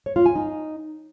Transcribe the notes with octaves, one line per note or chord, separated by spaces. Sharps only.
C#5
F4
G#5
D#4